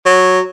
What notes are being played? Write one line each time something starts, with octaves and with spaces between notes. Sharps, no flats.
F#3